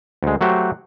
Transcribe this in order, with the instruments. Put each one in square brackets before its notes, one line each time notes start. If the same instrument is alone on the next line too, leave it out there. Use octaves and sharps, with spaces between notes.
[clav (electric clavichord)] D2 G#3
F#3 A3 F#4 G4 C5